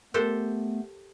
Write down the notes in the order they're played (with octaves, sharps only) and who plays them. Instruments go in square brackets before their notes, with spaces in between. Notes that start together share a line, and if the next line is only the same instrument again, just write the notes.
[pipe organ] A3 B3 [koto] G4 A4 C5 [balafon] A#4